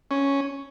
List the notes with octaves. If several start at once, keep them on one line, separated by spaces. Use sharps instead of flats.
C#4